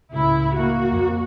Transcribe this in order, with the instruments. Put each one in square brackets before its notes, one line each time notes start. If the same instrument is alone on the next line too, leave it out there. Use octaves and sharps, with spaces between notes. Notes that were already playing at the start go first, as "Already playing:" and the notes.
[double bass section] C#2 A2 [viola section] E4
[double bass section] A#3 [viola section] F#4
[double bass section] F2